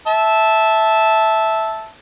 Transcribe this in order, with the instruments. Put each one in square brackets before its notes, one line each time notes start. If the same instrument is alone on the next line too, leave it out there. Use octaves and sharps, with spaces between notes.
[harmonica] E5 A5